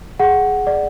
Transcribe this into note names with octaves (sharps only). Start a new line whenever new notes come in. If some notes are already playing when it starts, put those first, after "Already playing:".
G#4 F#5
D5